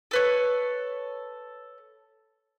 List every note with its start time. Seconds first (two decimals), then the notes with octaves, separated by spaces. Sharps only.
0.11 A4 B4 C#5